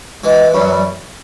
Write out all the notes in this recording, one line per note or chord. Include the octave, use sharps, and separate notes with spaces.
E3 G#3
F#2 G3
F#3
G3